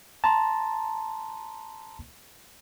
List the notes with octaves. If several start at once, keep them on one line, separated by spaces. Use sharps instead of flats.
A5 A#5 C6